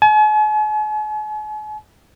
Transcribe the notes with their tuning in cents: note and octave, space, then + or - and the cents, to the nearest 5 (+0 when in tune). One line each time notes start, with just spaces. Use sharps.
G#5 +45